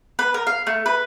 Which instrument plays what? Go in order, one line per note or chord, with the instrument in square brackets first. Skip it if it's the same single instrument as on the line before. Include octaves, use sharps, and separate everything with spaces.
[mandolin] B4
A#4
F5
A3
B4